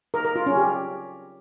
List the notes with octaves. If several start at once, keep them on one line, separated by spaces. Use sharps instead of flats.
A#4
A#4
F4
C#4
G4